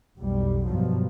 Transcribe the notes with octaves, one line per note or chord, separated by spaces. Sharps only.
B1 F2 G3
G2 B2 F3 F#3